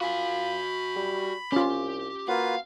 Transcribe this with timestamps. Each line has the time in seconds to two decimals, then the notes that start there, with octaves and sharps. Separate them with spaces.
0.01 F4 F#4 G#5 B5
0.96 G3
1.52 C2 C#4 F4 G4
2.28 A#3 F4 F#4 B4 F5